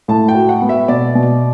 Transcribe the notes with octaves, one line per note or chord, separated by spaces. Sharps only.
A2 A5
G5
F#4
F#5
B3
E5
B2 D5
B2